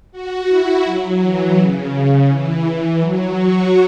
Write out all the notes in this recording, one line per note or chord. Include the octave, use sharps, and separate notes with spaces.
F#4
E4
F#3
E3
C#3
E3
F#3
F#4